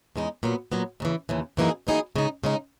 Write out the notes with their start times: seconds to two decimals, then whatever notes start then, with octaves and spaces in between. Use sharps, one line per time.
0.16 E2 C#3 G#3 D#4
0.43 A#2 F#3 B3
0.72 A#2 F#3 B3
1.00 D#2 C#3 E3
1.29 D#2 C#3 E3
1.57 F#2 E3 A#3 D#4 G#4
1.87 F#2 E3 A#3 D#4 G#4
2.16 C#3 G#3 D#4
2.44 C#3 G#3 D#4